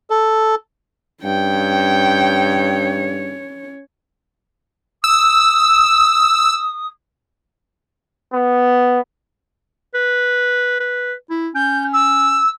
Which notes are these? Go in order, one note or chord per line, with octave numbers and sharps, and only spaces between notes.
A4
G2 C#4 C#5 G5
D#6 E6
B3
B4
B4
E4
C#4 G6
E6